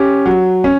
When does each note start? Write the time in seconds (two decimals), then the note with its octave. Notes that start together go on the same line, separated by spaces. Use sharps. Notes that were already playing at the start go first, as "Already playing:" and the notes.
Already playing: C#4 G4
0.26 F#3
0.64 C#4